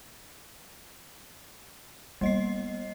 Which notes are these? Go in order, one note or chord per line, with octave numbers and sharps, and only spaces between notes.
G3 A#3 B3 D#5 C7